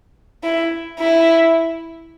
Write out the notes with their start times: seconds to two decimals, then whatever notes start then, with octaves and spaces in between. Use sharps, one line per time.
0.43 E4
1.00 E4